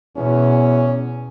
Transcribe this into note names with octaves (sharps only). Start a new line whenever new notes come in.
E2 B2 C#4